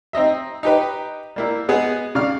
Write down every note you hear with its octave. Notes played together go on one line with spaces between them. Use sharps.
C4 D#4 D#5 E5
D#4 G4 B4
G3 A#3 E4
G#3 B3 G#4
C#3 D5 F5 F6